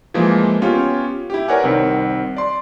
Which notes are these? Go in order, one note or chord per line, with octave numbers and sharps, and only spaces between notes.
E3 F3 G#3 A#3
B3 C#4 F4 G4 C#5
E4 G4
A#4 B4 C#5 D5 F#5 G#5
C2 D#3 C4
D5 C6